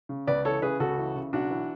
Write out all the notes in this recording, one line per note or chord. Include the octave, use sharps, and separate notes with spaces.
C#3
C#2 B4 D5
E3 A4 C#5
C#3 G#4 B4
C#2 F#4 A4
E3
C#3
B1 D4 F#4
E3